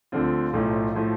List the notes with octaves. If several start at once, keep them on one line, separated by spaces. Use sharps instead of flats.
D2 D3 F3 C4 F4
B1 A2 F3 A3
A2 F3 A3